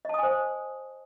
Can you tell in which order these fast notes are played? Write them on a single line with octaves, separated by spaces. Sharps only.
D#5 A5 D#6 G#5 C5